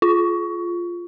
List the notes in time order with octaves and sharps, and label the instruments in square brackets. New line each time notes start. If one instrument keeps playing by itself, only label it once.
[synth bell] F4